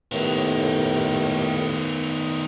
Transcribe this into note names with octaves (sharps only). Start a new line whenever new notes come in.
D#2 A2 D#3 B3